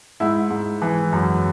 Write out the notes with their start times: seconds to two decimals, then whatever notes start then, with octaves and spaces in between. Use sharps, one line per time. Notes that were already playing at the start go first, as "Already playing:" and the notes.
0.20 G#2 E4
0.50 G#2
0.82 E3
1.12 F#2